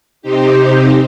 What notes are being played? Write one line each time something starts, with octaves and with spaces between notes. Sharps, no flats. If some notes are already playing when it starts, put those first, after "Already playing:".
C3 C4 D#4 G4